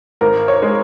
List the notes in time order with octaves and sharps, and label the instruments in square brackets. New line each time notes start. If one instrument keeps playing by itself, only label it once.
[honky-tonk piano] G#1 A#4
C#5
G#3